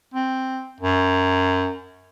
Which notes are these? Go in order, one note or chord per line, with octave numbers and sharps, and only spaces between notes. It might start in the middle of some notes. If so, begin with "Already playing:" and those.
C4
F#2